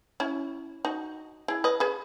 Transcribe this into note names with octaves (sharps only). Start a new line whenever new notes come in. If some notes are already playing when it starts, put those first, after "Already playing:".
C#4 E4
D#4 F#4
E4 G#4
B4 D#5
G#4 B4